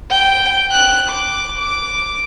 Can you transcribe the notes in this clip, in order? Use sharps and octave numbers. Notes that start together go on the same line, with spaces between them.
G5
F#6
D6
D6